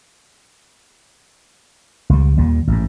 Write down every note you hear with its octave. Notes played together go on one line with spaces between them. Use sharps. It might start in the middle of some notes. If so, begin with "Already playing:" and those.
C#2 G3
D#2 A#2 G3
A1 G#2